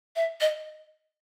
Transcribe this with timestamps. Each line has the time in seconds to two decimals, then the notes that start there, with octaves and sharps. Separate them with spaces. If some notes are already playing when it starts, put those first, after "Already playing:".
0.16 E5
0.41 D#5